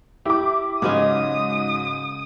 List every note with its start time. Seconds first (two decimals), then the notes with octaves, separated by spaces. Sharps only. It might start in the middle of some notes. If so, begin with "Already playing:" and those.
0.25 E4 G4 D6
0.82 G#2 C#3 F#3 G#3 B3 C#4 D#6